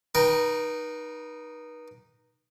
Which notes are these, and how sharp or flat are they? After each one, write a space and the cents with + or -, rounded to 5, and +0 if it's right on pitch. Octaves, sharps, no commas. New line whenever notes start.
D#4 -10 B4 -40 G5 +0